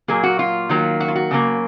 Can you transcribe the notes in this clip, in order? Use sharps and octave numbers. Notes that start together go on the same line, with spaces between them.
A#2 F#3 A#3 G#4
F#4
F4
D#3 F#3 A#3
F#4
F4
F#4
C#3 F#3 A#3